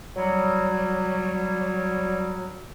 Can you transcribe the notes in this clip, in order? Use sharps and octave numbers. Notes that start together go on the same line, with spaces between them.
F#3 G3